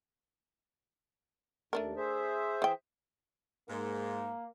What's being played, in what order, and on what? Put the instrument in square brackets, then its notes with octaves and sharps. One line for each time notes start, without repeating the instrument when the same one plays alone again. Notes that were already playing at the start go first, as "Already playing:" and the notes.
[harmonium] D#2 [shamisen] A3 D4 A#4
[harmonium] G#4 C5 E5
[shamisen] E3 G5
[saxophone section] G#2 [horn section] A#3